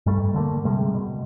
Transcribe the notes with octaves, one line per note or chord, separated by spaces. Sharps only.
G2 G3 A3
D3 A3 A#3
C3 G3 G#3
B2